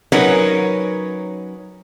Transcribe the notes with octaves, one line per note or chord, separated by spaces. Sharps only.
F#3 C#4 D#4 A#4 B4 C#5